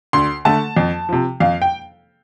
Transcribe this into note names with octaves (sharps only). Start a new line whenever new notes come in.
D2 C6
D3 A3 A5
F2
C3 F3
F2 F5
G5